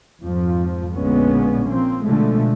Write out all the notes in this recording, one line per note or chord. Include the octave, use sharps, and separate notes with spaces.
F2 G#2 F3
A#1 A#2 D3 G#3 B3 C#4
F3 A#3 C4
B2 D3 F3 G#3 A3